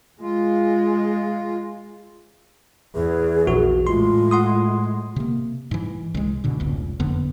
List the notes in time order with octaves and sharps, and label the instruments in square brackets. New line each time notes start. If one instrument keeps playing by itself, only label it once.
[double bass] G#3 [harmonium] F4
[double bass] E2 [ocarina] G#4
[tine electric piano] A#1 F#4
[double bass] A2 G#3 [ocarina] F4 [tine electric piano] C6
[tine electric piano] F#5 C6 D#6
[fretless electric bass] C3 A#3
G#2 E3
C2 G#3
G#2 B2 D3
F1 C#2
F#1 F2 D3 B3